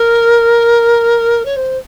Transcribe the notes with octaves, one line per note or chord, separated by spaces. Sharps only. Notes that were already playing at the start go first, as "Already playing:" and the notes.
Already playing: A#4
C#5
C5